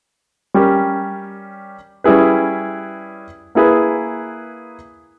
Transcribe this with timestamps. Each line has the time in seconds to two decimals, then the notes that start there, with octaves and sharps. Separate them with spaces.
0.54 G3 C#4 G4 A#4
2.04 G3 C#4 E4 G#4 B4
3.55 A#3 E4 G#4 B4